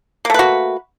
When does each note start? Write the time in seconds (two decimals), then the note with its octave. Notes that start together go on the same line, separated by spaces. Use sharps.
0.25 A#3
0.30 A3
0.34 B4
0.39 F#4